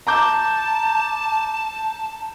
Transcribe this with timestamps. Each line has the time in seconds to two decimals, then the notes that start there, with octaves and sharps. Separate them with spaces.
0.07 A5 A#5 D6 G6